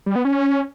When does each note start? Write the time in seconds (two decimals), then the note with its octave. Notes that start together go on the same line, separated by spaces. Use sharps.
0.06 G3
0.16 B3
0.25 C#4